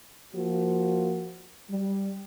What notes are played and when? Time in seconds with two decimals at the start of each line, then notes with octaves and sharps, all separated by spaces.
0.34 F3 A#3 F#4
1.71 G3